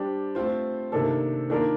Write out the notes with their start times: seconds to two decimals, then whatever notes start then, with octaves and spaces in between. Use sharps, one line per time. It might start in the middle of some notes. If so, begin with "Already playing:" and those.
Already playing: G3 D4 G4 C5
0.35 A3 C4 F4 C5
0.92 C3 D#3 A#3 D4 A4
1.50 D#3 A#3 D4 F4 A#4